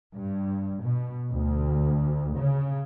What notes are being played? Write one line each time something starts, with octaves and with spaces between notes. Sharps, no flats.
G2
B2
D2
C#3